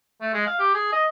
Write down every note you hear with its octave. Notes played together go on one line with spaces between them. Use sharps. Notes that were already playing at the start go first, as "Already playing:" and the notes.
A3
G#3
F5
G4
G#4
D#5